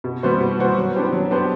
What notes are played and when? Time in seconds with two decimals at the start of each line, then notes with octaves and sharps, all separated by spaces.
0.04 B2
0.23 G3 B3 F#4 C5
0.40 B2
0.59 G3 B3 F#4 C5
0.77 F#3
0.95 B3 D4 G4 C5
1.13 F#3
1.31 B3 D4 G4 C5